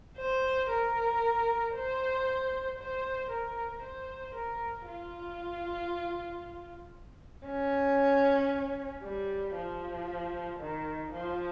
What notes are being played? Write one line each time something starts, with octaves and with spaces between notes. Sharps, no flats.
C5
A#4
C5
C5
A#4
C5
A#4
F4
C#4
G3
F3
D#3
F3